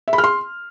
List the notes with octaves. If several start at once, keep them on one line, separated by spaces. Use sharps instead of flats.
E5
B5
F6
C6